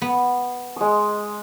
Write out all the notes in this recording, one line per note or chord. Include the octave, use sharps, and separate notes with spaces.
B3
G#3 D#6